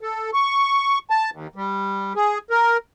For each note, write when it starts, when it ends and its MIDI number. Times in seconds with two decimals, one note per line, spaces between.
0.01 0.31 69
0.34 0.98 85
1.10 1.30 81
1.32 1.47 39
1.56 2.13 55
2.16 2.38 68
2.50 2.77 70